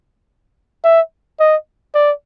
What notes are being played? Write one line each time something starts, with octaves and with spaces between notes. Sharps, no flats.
E5
D#5
D5